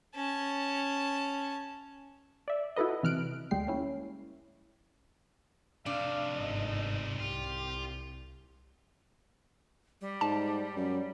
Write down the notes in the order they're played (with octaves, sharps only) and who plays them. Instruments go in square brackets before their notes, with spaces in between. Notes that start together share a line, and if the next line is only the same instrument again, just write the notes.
[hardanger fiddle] C#4 A5
[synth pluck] D5 E5
E4 F#4 A4 B4 D#5
C3 E3 F6 F#6 D7
D2 G3 G#3 G5 C7
A#3 C#4 E4
[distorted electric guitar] C3 A3 [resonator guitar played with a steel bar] D4 [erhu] F5
[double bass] G1 G#2 [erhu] D#5
[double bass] C2 [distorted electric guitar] F4 [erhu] G4
[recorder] G3
[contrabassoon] G#2 [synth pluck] A5
[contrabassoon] F#2